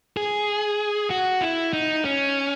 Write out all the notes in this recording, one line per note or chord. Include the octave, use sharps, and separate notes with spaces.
G#4
F#4
E4
D#4
C#4